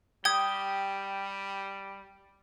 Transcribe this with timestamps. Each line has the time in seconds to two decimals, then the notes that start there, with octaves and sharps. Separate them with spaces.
0.25 G3 G4 G5 D#6 G#6